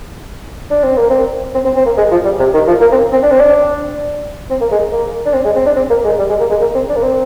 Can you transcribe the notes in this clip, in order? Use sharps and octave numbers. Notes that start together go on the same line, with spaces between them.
D4
C4
A#3
C4
C4
C4
C4
A#3
G#3
F3
G3
C3
D#3
F3
A#3
C4
C4
D4
C4
D4
C4
A#3
G#3
A#3
D4
C4
G#3
C4
D4
C4
A#3
G#3
G3
G#3
A#3
G#3
A#3
C4
D4
A#3
C4